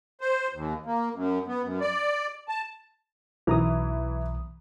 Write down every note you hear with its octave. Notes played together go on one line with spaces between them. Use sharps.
C5
D#2
A#3
F#2
B3
F#2
D5
A5
B1 E3 A#5 D#6